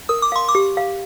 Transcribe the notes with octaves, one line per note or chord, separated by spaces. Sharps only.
A#4 D#6
D6
F5 C6
D6
G4
F5